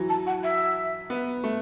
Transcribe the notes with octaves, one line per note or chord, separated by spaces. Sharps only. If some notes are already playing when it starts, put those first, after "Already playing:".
Already playing: E3 F#3
A5
F#5
E5
B3
A3